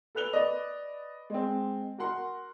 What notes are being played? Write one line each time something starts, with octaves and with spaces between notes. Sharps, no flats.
A4 B4 F#6 F7 G7
B4 D5 D#5
G#3 C4
F#4 A#4 F#5 C6